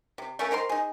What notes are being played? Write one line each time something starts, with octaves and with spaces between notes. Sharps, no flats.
C3
A3 C#4 A#4 F5
D#3 A#4 C5 C6
D#4 G#4